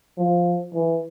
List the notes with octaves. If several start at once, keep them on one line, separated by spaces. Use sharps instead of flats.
F3
E3